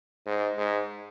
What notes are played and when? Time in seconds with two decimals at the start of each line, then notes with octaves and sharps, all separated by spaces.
0.26 G#2
0.58 G#2